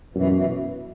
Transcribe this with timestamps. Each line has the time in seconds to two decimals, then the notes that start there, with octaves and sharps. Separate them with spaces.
0.15 F#2 B2 E3
0.33 B2 E3